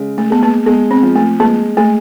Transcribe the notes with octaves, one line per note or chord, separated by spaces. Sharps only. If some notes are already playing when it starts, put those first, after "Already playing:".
Already playing: C#3 G#3
A3
G#3 B3
A#3
G#3 B3
C4
F3
A3
G#3 A#3
G#3 A3